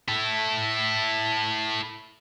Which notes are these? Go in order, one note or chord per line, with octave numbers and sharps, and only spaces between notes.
E4 A4